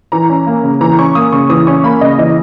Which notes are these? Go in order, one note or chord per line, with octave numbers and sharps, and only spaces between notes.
E3 A#5
C#4
A#3
C#3
E3 A#5
C#4 C#6
A#3 D#6
C#3 C#6
E3 D#6
C#4 C#6
A#3 B5
C#3 D#5
E3 D#5